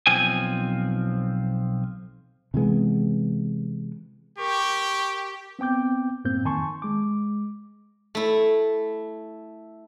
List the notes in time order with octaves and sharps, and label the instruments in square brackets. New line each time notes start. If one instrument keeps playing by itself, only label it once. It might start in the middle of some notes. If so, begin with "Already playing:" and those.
[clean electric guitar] B1 F3 C4 G#5
[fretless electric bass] C3 E3 G#3 B3
[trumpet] G4 [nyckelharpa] A#4 C#6
[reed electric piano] B3 C4 G5 D6 G6
F#2 A2 A#3 C4 G6
F2 D#3 G#5 A5 C6 C#6
G#3 D6
[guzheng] A3 E4